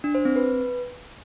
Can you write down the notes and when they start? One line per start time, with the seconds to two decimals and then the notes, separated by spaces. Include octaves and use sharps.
0.04 D4
0.15 C5
0.25 C4
0.36 B4